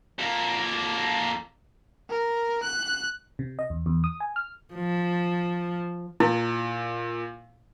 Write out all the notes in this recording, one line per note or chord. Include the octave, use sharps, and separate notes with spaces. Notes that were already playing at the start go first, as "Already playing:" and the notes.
F2 A#3
A#4
F#6
C3
D#5
E2
E2
D#6
G#5
F6
F3
A#2 E4